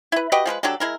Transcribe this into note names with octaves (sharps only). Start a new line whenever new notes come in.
E4 B4
F#4 G4 B4 D#5
F3 G#3 A#4 B4
F#3 D4 G4 A4
G#3 E4 A#4